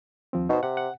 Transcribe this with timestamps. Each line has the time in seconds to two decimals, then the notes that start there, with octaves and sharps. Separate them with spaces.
0.33 D#2 F3 C4
0.49 B2 D#4 C5
0.63 C3 F#5
0.77 F#5